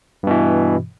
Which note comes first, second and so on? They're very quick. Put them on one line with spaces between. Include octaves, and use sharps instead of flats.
G2 B2 E3